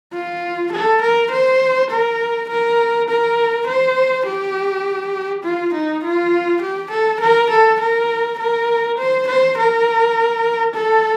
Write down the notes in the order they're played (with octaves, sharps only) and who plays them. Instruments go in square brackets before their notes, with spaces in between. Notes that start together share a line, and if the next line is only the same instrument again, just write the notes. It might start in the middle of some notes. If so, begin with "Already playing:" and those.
[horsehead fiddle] F4
A4
A#4
C5
A#4
A#4
A#4
C5
G4
F4
D#4
F4
G4
A4
A#4
A4
A#4
A#4
C5
C5
A#4
A4